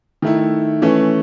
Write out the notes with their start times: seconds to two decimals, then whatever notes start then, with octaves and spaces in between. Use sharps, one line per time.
0.22 D#3 A3 E4
0.82 E3 A3 C#4